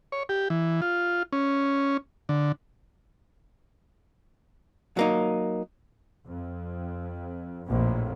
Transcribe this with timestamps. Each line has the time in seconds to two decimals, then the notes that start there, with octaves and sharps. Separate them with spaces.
0.12 C#5
0.29 G4
0.50 E3
0.82 F4
1.33 C#4
2.29 D3
4.97 F#3 A#3 D#4
6.26 F2
7.67 A#1 F2 A2